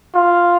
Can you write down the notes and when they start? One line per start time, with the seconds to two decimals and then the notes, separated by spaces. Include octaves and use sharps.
0.15 F4